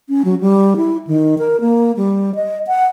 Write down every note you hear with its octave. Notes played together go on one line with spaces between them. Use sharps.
C#4
F#3
G3
E4
D#3
A#4
A#3
G3
D#5
F#5